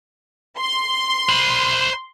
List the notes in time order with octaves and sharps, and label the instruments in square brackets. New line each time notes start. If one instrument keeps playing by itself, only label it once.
[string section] C6
[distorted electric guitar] C5 B5